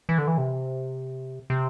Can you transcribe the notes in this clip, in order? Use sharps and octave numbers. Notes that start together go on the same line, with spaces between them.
E3
D3
E3
C3
C3